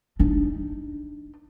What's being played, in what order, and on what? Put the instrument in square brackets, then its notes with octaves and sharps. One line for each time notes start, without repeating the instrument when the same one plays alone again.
[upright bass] D4 D#4